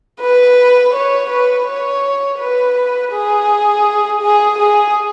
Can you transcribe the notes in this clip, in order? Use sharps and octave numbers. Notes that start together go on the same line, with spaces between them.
B4
C#5
B4
C#5
B4
G#4
G#4
G#4